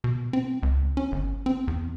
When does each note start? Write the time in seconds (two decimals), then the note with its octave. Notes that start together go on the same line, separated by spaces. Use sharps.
0.04 B2
0.33 C4
0.63 C#2
0.97 C#4
1.12 G1
1.46 C4
1.68 E2